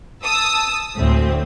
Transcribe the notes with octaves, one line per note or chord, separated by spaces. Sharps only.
A5 D#6 E6
D2 A2 C4